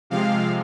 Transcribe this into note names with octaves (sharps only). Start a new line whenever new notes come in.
C3 F3 G#3 C4 F5